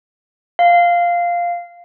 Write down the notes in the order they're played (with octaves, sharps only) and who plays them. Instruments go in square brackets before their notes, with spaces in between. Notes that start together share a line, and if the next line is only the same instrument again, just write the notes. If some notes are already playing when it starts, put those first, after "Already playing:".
[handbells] F5